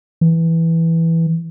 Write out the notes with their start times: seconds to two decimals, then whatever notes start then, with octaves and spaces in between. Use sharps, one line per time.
0.21 E3